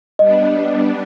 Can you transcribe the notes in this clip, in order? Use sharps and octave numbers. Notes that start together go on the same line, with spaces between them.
G3 B3 D4 D#5